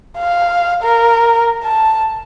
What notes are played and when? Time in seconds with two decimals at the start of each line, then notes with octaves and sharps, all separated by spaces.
0.18 F5
0.83 A#4
1.63 A5